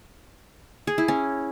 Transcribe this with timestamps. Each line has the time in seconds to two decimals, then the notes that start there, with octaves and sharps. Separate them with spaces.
0.87 G#4
0.98 E4
1.08 C#4